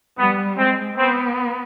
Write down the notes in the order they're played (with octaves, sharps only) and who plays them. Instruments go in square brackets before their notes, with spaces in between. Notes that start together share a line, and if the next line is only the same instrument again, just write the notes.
[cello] G3 [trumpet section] B3
[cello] G#3 [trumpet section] C4
[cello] B3 [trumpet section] C4